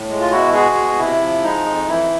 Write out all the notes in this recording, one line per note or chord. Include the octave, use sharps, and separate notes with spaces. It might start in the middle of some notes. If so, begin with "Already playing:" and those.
Already playing: A2
G#3
F4
B2 E4 F#4
G#3 F#4 G#4
B2
C3 E4
F3
G#3 D#4
F2
E3 E4